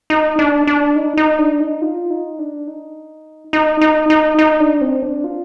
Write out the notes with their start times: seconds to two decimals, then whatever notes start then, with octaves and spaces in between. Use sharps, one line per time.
0.10 D#4
0.39 D4
0.67 D4
0.96 D#4
1.17 D#4
1.39 D4
1.60 D#4
1.82 F4
2.10 D#4
2.39 D4
2.67 D#4
3.53 D#4
3.81 D#4
4.10 D#4
4.39 D#4
4.60 D4
4.81 C4
5.03 D4
5.24 F4